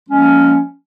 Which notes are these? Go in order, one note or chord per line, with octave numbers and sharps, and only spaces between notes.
F3 G#3 A#3 C#4